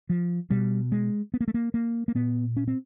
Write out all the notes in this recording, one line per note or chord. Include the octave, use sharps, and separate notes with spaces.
F3
B2 G3
G#3
B3
A#3
A3
A#3
A#3
A#3
A#2 B3
C#4
C4